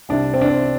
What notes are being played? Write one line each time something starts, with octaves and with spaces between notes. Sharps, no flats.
C2 C3 G3 D4
C4
D4
C4